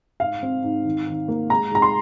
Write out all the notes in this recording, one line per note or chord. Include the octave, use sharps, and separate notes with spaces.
G#2 F5
C4
G#2
D#3
D#3
A#3
G#3 A#5
G#3 A#5
C6